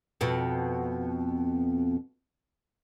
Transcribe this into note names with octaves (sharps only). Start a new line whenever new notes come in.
F2 B2